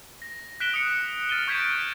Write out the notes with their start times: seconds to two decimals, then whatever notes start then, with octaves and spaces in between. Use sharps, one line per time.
0.22 A#6
0.60 F#6 B6 D7 E7 G7
0.74 D#6 C#7
1.29 F6 A6 D#7 G7
1.48 C#6 G6 G#6 B6 D7 E7